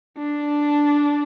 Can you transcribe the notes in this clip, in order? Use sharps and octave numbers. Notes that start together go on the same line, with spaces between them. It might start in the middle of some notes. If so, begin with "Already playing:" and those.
D4